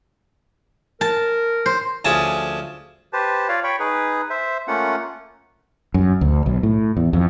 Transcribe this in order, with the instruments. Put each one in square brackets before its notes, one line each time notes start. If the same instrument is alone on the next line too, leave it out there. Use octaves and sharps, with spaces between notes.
[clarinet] A#4 [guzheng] A5
[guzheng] C5
[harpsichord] D2 F3 C#4 G#4 A5
[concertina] G4 B4 C5 A5
F4 C#5 D5 F5
C#5 G5 B5 C#6
D#4 G#4 B4
C5 E5
A3 A#3 C#4 F4 F#5
[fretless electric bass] F#2
D2
B1
A2
E2
F2